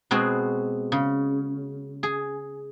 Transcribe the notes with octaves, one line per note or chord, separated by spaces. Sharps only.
B2 G#3 C4 F#4 G#4
C#3
G#4